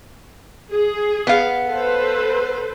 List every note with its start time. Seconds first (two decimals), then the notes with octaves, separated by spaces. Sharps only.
0.74 G#4
1.27 B3 F5
1.67 A4 B4 C5